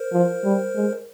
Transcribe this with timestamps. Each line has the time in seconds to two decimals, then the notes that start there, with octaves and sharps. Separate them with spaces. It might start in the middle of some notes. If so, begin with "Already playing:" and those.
Already playing: A#4 C5
0.12 F3
0.43 G3
0.75 G#3